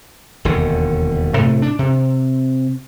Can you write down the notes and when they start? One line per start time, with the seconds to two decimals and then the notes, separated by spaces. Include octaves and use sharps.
0.45 E1 D#2 D3
1.36 A2 C3 A3
1.62 D4
1.79 C3